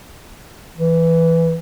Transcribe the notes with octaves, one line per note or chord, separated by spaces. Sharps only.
E3